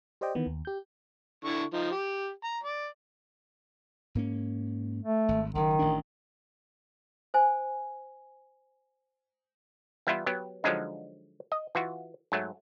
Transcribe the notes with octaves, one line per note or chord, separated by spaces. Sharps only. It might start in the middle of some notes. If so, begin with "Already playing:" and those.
G4 C5 D5 D#5 G5
D#3 E3 B3
D#2
G4 G6
D3 E4 C#6
F3 D#4
G4
A#5
D5
G#2 A#3 C#4
A3
G#1
F#1 D#3
A1 D4
C5 G#5
E3 G3 B3 E4 F4
F#3 B3 G4
D3 F3 F#3 G#3 D4 D#4
D#5
E3 F4 F#4
G#2 F#3 A3